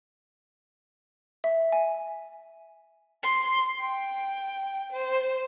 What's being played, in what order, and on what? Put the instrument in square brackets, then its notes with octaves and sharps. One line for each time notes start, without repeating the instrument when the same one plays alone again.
[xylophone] E5
G#5
[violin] C6
G5
C5